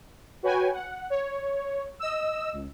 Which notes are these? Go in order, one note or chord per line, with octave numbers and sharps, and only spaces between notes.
F#4 B4 C#5 G5 G#5
F#5
C#5
D#5 E6
C#2